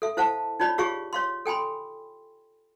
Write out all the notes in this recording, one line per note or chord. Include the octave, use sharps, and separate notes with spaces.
A4 E5
E4 C5 F5 F#5 A5
D#4 F4 C#5 D5 B5
F4 G4 G#4 C#5 F5 C#6
C#5 F5 C6
A4 G5 G#5 B5 C6